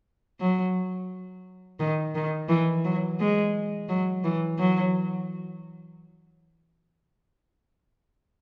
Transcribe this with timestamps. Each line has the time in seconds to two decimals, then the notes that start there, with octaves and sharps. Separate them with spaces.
0.40 F#3
1.80 D#3
2.15 D#3
2.49 E3
2.84 F#3
3.20 G#3
3.89 F#3
4.24 E3
4.59 F#3